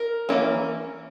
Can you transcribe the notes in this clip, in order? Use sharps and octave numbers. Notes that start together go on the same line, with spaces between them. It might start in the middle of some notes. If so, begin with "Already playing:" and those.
Already playing: A#4
E3 G3 A#3 C#4